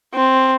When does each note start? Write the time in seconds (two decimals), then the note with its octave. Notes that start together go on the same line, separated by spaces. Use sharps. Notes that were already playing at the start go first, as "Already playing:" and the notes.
0.15 C4